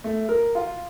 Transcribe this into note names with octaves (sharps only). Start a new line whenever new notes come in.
A3
A#4
F4